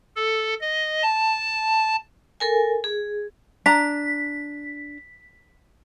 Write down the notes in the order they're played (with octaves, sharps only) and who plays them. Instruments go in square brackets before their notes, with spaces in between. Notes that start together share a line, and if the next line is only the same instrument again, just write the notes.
[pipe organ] A4
D#5
A5
[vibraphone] A4 A#4 G#5
G#4
[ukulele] D4 A#5 [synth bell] B6